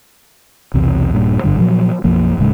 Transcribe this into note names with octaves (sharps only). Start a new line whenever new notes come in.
B1 E2 C3
D#1 G2 A#2
G#1 G2 D3 G3
A#2 F3 F#3
B1 F#2 F3 A#3
D#1 A2 C#3 G#3